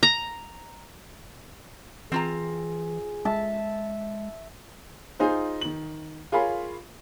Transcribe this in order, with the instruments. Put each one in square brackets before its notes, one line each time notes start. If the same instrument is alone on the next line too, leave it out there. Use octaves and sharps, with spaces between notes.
[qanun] A#5
[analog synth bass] E3 [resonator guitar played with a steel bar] C4 F4 A#5 [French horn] G#4
[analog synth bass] G#3 [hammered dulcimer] E5 A5
[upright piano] D#4 F4 G#4 C5
D#3 F#7
F4 G#4 A#4 C#5 F5 B5